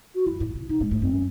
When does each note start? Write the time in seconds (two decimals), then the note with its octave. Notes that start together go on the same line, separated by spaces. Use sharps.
0.15 F#4
0.26 F#2 E4
0.40 A2
0.55 C3
0.69 C3 D#4
0.80 A2 G#3
0.91 G#2 A3
1.02 F#2 C4
1.12 C#4